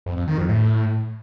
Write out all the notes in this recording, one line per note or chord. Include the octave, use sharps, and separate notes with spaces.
F2
F2
D#3
F2
A2